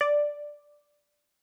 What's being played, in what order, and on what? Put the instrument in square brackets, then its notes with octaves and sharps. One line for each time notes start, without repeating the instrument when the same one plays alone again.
[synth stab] D5